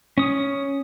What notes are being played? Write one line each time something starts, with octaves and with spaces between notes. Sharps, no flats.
C#4 D#6